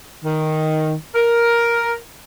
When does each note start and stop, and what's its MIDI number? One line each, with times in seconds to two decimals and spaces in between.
0.25 0.93 51
1.15 1.94 70